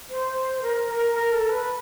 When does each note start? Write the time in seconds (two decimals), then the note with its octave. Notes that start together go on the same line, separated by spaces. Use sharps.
0.09 C5
0.62 A#4
0.89 A#4
1.14 A#4
1.32 A4
1.49 B4